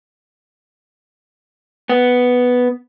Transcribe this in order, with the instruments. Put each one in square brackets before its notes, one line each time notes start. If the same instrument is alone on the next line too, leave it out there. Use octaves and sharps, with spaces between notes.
[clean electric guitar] B3